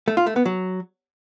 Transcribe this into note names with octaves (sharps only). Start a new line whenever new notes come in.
A3
F4
A3
B3
F#3